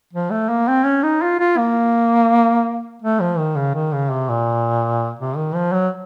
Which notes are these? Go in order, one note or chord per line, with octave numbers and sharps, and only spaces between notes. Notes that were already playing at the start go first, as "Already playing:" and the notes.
F3
A3
A#3
C4
C#4
D#4
F4
F4
A#3
A3
F3
D#3
C#3
D#3
C#3
C3
A#2
C3
D#3
F3
F#3